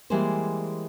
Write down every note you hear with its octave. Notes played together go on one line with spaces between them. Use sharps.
E3 G3 G#3 A#3 G#4 C5